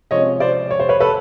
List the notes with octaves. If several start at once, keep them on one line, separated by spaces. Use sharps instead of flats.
C3 F3 G#3 C#4 C#5 D#5
C5 D5
C#5
C5
B4 C#5
A4 B4